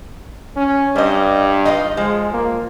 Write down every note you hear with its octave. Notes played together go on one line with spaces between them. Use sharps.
C#4
G2 G3 D#5
D#4 F4 D#5
F3 G#3
A#3